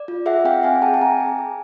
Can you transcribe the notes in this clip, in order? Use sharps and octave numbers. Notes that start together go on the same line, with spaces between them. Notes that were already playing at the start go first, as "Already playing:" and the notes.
Already playing: D5
F4
G#4 E5 F#5
C4 F5 G5
C4 F#5 G#5
G#4 G5 A5
A5
C4 G#5 A#5
G#4
G#4